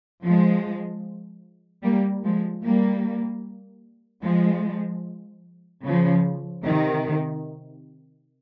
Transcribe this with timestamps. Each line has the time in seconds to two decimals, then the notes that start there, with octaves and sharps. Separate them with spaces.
0.23 F3 G#3
1.84 G3 A#3
2.24 F3 G#3
2.63 G3 A#3
4.23 F3 G#3
5.84 C#3 F3
6.63 C3 D#3